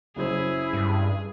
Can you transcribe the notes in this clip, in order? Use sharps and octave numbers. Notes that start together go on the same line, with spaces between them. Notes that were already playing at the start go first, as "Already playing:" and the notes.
F#1 F#3 E4 G#4 C5
G2